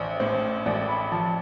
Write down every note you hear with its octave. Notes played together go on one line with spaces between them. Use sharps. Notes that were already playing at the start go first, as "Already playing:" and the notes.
Already playing: A1 C5 D5
A2 C5
A1 D5
B5
F3 A5